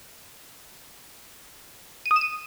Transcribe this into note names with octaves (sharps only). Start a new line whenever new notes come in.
D#7
D#6
E7
D#7